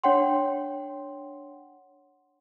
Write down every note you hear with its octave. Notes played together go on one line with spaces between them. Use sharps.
D4 C#5 F#5 G5 C6